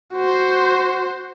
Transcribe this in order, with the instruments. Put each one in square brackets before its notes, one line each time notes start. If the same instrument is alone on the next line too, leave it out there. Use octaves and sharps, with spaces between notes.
[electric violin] F#4 C5